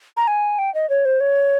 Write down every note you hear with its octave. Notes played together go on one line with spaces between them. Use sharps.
A#5
G#5
G5
D#5
C#5
C5
C#5